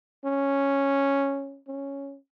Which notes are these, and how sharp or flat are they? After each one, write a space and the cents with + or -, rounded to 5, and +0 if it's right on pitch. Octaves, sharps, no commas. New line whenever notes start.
C#4 -5
C#4 +0